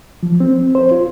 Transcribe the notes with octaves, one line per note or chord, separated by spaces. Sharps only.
F3
C4
C5
F4